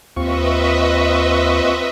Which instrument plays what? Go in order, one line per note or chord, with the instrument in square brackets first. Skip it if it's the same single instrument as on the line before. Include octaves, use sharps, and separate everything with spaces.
[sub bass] D#2 [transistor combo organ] C4 F4 C#6 [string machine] B4 D#5 E5